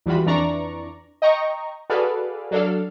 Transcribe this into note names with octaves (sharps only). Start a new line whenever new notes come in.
E2 E3 G3 F4 F#4 B5
F2 E3 D4 D5 A#5 C#6
D#5 G5 A#5 C#6
F#4 G#4 A4 B4 D5 F5
F#3 D4 A4 F5